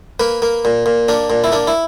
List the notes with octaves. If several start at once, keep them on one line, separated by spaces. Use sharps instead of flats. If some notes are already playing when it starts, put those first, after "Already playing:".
A#3 B4
A#3
A#2
A#2
A#3 D4
A#2
E4
A#3 D4
E4